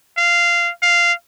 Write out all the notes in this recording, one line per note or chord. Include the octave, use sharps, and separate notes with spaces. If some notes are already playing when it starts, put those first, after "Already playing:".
F5
F5